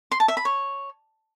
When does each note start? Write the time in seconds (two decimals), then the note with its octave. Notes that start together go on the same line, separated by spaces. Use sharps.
0.12 C6
0.20 A5
0.28 E5
0.37 B5
0.45 C#5